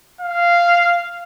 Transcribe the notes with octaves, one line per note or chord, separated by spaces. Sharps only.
F5